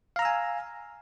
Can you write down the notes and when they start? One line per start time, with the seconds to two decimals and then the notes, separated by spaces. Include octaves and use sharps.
0.16 F5
0.19 A#5
0.22 E6
0.25 G#5